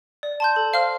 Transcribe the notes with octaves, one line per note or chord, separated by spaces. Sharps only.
D5
A5 C6 G6
A4
C5 F5 C6 F6